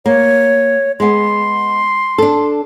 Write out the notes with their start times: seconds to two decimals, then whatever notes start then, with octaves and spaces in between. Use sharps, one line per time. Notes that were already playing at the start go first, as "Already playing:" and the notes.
0.06 A#3 C#5
1.00 G#3 B3 C6
2.18 D4 A4